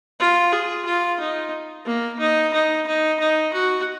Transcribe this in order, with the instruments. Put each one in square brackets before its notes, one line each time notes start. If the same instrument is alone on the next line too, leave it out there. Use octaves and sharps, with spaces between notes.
[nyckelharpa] F4
G#4
F4
D#4
A#3
D#4
D#4
D#4
D#4
F#4